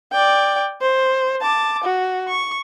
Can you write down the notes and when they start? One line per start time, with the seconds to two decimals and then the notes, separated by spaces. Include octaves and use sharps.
0.12 D5 G5
0.81 C5
1.41 A5 D6
1.84 F#4
2.28 C#6